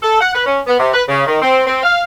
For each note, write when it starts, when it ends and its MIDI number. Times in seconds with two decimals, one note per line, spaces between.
0.03 0.17 69
0.21 0.31 78
0.35 0.42 71
0.46 0.60 61
0.67 0.76 59
0.79 0.91 48
0.94 1.03 71
1.07 1.23 49
1.26 1.40 51
1.42 1.62 60
1.67 1.81 60
1.83 2.02 77